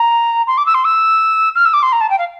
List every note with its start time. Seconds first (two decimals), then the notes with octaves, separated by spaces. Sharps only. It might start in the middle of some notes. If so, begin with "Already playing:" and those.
Already playing: A#5
0.47 C6
0.58 D6
0.66 E6
0.74 C6
0.85 E6
1.55 F6
1.65 E6
1.74 D6
1.83 C6
1.93 A#5
2.01 A5
2.10 G5
2.19 F5